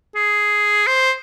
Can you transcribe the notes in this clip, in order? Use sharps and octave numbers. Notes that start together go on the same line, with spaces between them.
G#4
C5